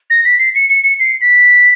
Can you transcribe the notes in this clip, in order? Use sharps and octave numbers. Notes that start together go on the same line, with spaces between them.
A#6
B6
C7
C#7
C#7
C#7
C7
B6